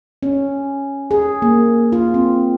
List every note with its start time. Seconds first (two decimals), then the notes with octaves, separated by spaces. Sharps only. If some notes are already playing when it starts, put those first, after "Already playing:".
0.23 C#4
1.11 G#4
1.42 A#3
1.92 F4
2.14 C4